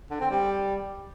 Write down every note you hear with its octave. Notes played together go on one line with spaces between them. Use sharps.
D3
C4
G3